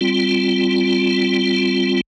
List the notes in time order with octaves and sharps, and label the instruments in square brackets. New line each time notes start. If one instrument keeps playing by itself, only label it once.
[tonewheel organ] G3 C4 F4